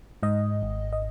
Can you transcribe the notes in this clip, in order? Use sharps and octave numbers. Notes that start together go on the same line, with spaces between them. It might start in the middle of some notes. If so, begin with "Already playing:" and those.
G#2 D#5
G#1
D#5